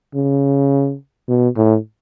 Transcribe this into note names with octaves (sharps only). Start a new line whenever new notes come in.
C#3
B2
A2